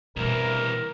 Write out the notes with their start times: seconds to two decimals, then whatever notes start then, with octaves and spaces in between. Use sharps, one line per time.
0.16 C2 B2 E3 A3 A#4